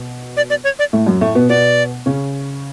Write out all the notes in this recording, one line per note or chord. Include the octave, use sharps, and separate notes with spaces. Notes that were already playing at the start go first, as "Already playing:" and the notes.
Already playing: B2 B3
D5
D5
C#5
D5
A2 A3
F#2 F#3
A2 A3
B2 B3
B2 B3 D5
C#3 C#4